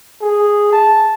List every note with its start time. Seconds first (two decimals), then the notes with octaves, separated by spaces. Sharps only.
0.22 G#4
0.73 A5